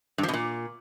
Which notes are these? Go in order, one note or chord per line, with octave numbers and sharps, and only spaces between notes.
G2
F3
B2
A#2